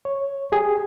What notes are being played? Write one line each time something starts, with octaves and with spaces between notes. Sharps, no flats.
C#5
G4 G#4